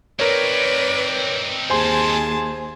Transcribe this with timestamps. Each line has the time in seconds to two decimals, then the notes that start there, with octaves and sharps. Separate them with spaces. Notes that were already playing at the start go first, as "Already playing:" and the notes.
0.19 C4 D#4 A#4 B4 C#5 D5
1.70 D#2 G#4 C5 G#5 A5 C6